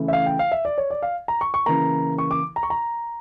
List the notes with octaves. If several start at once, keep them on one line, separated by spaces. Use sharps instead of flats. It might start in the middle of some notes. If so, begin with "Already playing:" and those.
Already playing: C#3 E3 A3 E4
E5
F5
G5
F5
E5
D5
C#5
D5
F5
A#5
C#6
C#6
C#3 E3 A#3 A#5
C#6
D6
A#5
C#6
A#5